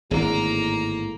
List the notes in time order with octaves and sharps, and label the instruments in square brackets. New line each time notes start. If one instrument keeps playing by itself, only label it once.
[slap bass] G#1 D3 [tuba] A2 [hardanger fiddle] A#3 A#5 [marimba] G#4